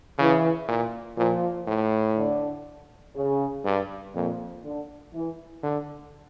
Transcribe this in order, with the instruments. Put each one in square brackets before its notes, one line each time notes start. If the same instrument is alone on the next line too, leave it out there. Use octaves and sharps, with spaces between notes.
[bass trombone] C#3 [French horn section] E3
[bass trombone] A#2
[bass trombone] A#2 [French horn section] F3
[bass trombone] A2
[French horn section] D3
C#3
[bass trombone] G2
[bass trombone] F2 [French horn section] A#2
[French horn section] D3
E3
[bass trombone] D3